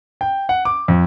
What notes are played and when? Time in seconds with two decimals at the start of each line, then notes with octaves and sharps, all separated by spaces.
0.21 G5
0.49 F#5
0.65 D6
0.88 F2